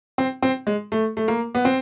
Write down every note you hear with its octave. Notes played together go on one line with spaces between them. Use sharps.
C4
C4
G#3
A3
A3
A#3
B3
C4